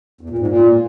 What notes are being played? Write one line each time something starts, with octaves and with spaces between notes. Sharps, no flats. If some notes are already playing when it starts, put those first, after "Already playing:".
E2
A#2
G#2
A#2